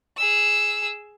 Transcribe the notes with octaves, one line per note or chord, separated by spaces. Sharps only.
G#4 E6